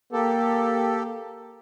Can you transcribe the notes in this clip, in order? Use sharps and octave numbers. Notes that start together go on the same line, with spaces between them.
A#3 G4 A4